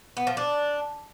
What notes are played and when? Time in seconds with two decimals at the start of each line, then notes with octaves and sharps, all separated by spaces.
0.17 B3
0.27 F3
0.37 D4